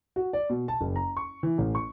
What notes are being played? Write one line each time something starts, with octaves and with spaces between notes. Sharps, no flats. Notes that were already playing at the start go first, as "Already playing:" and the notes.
F#4
D5
B2
A5
F#1
A#5
C#6
E3
A1
C#6